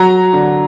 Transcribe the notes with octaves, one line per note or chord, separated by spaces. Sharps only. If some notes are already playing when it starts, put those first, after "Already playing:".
Already playing: F#3 A#5
D3